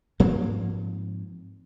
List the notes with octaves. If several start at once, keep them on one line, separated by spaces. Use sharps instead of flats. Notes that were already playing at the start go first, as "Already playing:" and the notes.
G#2 F3 A#3 C4